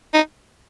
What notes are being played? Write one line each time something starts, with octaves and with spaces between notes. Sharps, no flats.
D#4